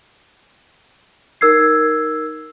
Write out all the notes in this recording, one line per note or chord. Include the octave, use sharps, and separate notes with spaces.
D#4 A#4 E6 G#6 C7